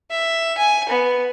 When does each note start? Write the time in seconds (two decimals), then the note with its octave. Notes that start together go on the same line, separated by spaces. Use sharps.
0.11 E5
0.58 G#5
0.89 B3